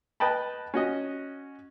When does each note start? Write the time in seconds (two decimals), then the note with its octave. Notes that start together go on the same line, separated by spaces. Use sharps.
0.20 B4 D#5 G5 A5 B5
0.74 C#4 F#4 D#5